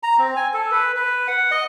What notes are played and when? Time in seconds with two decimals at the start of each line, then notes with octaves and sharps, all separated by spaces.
0.03 A#5
0.18 C4
0.36 G#5
0.54 A4
0.71 B4
0.97 B4
1.28 F#5
1.51 D#5